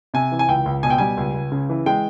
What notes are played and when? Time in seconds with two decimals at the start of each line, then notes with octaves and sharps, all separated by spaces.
0.14 C3 G#5
0.32 E3
0.39 G#5
0.48 C#2 G5
0.66 C#2
0.83 B2 G#5
0.90 G5
0.98 G3 G#5
1.17 C#2
1.34 C#2
1.52 C#3
1.70 E3
1.86 G#3 G5